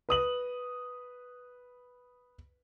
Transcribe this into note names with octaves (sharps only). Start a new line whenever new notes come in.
B4 D#6 F#7